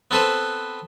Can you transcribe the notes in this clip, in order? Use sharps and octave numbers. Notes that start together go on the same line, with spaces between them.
B3 C4 A4 B4 C5